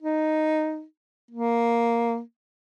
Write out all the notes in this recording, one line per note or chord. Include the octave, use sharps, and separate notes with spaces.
D#4
A#3